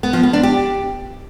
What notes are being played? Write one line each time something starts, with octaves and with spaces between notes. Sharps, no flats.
B3
F3
B3
D4
G4